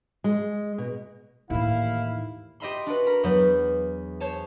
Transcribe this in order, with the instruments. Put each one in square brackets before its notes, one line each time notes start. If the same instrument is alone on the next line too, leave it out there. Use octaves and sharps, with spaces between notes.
[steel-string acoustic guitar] G#3
B2
[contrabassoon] D#2 [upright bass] A2 E3 [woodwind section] E4 [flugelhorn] F5
[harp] G4 D#5 E5 B5 C6
D4 F#4 B4
A#4 B5
E2 F#3 B3 B4 G6
C5 C#5 A5